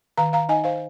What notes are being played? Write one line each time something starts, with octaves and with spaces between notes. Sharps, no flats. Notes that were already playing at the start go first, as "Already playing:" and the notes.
D#3 F5 A#5
F5 A#5
D#4 D#5 G#5
C5 F5